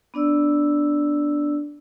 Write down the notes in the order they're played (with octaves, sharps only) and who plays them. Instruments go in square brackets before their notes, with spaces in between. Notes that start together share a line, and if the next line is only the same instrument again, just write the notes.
[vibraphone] B3 D4 D5 E6